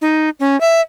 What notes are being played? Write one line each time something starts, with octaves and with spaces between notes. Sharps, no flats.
D#4
C#4
E5